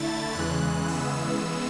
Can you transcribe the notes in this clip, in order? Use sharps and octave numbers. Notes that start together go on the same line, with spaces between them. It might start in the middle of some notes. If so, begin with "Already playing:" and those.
Already playing: D3 A3 E4 A6
E2 C#3 E3 G#3 F#6
C#3 E3 G#3 B3 E6